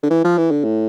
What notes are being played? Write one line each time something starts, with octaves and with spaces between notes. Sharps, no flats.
D3
E3
F3
E3
D3
A2